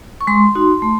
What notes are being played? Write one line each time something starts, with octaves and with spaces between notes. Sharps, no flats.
C#6
G#3 C6
D#4 F#4
A3